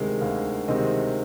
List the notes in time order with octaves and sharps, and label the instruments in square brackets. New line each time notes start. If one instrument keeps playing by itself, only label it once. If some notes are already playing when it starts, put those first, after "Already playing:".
Already playing: [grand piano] D2 C3 D#3 G#3 C4
D2 F5
C3 D#3 G#3 C4 D#5